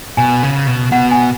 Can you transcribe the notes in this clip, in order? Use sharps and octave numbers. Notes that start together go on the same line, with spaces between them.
B2 G#5
C#3
B2
B2 F#5
G#5